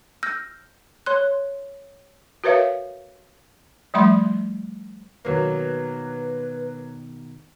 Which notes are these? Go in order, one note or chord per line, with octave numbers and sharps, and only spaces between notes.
E6 F6 G6 A#6
C#5 C6 F#6
F#4 A#4 B4 C#5 E5 F5
F3 G3 A3 E5 B5 C6
B2 D#3 F#3 A#3 B4